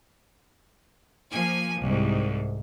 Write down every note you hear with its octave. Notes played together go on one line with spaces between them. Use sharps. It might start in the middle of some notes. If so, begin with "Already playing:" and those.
F3 A#3 G#5
C2 G#2